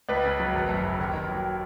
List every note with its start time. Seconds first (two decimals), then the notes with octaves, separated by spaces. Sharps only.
0.09 C#2 B4
0.24 C#3
0.40 F#3
0.53 G#1
0.69 F#2
0.83 C#3
0.98 D#2
1.13 D#3
1.29 F#3